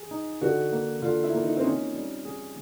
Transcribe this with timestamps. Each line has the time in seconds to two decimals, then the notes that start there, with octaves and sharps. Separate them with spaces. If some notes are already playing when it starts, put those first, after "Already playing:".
Already playing: G#4
0.11 D#4
0.41 D3 F#4
0.72 A#3
1.02 D3 F4
1.24 E4
1.33 A#3
1.43 D#4
1.57 C4
1.64 C#4 D#4
1.94 G3
2.25 G#4